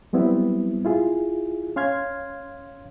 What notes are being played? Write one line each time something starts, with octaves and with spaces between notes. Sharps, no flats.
F#3 G3 B3 C4 E4
E4 F4 G#4
C#4 F5 C6 F6 G#6